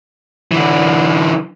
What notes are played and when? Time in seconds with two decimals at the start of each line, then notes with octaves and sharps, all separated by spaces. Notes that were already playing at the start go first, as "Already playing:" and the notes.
0.51 D3 E3